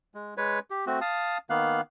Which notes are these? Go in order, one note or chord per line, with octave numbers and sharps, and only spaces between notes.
G#3
G#3 B4 C#5
G4
A3 C4 F#4
F5 A5 D#6
D#3 A#3 B3 F5 F#6